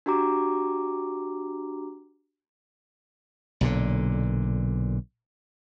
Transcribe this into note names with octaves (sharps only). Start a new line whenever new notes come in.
D4 F#4 G4 A#5 D6
B1 A#2 D3